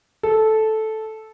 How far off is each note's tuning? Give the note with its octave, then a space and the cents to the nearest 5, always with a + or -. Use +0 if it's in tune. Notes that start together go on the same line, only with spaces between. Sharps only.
A4 -10